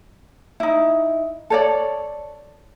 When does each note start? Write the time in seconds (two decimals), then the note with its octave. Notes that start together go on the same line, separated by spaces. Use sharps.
0.60 D#4 E4
1.50 A4 C#5 D5